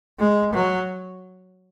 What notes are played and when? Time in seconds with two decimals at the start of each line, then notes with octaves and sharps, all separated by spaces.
0.19 G#3
0.53 F#3